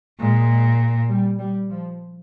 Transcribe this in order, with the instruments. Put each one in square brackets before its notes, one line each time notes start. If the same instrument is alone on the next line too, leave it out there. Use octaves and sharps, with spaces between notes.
[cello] A#2 [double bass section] G#3
[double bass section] G3
G3
F3